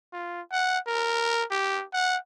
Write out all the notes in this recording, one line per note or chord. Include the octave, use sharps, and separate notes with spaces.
F4
F#5
A#4
G4
F#5